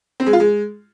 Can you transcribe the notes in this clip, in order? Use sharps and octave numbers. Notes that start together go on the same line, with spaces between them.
C4
G#3
F4
G#3